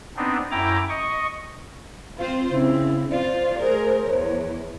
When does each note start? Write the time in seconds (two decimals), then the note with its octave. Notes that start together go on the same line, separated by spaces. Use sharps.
0.17 B3 C4 D4 D#4
0.51 F#2 E4 G5 A#5 D6
0.89 D#5 C#6
2.18 C4 F4 C5 F5
2.51 C#3 C4 E4
3.10 F4 C5 D5
3.60 A3 G#4 A#4
4.04 E2 C#5